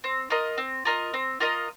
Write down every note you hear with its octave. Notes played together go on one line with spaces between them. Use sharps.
C4
F4 A#4 D#5
C4
F4 A#4 D#5
C4
F4 A#4 D#5